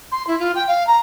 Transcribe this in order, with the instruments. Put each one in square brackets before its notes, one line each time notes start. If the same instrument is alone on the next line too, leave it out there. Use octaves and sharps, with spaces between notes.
[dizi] C6
E4
F4
G5
F5
A#5